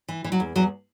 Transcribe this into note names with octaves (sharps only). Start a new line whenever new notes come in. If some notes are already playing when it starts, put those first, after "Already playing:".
E3
E3
F#3
E2
E2 F#3